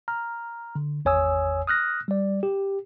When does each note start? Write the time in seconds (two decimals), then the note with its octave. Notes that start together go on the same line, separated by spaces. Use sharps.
0.08 A#5 F6
0.75 D3
1.05 G#1 E2 C#5 G#5 D#6 E6
1.67 D#6 F6 F#6 A#6
2.08 G3 D5
2.43 G4